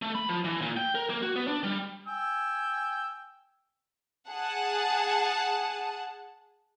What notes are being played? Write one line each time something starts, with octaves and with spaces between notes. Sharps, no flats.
A3
B5
F3
E3
A#2
G5
A#4
A#3
F#4
B3
D4
G3
G5 G#5 E6
G#4 F#5 A5